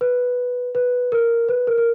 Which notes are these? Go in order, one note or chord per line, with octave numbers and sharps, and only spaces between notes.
B4
B4
A#4
B4
A#4
A#4